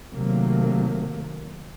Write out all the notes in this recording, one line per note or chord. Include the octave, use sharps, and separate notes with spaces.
C3 D#3 F#3 A3 A#3